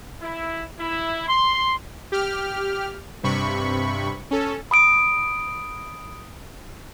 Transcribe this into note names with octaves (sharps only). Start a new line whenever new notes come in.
E4
E4
C6
G4 F6
G2 C3 B5 C#6
C#4 A4
B5 D#6 D7